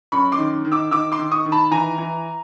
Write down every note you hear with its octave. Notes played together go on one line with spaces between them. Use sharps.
F#2 B5 C#6
C6 D6
D#3
D#3
D6 E6
D#3 D6 E6
C6 D6
D#3
C#6 D#6
D#3
A5 B5
E3 G#5 A#5
E3